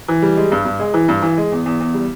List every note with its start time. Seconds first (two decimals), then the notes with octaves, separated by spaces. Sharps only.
0.08 E3
0.22 G3
0.37 G#3
0.52 G2
0.65 G2
0.79 G#3
0.94 E3
1.08 G2
1.22 E3
1.38 G#3
1.52 E2
1.66 E2
1.81 E2
1.94 G3